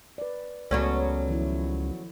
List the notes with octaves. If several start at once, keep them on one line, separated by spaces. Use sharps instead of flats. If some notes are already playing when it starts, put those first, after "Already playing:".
B4 D5
C#2 F#3 B3 C#4 A4 D5
D#3 F3 E4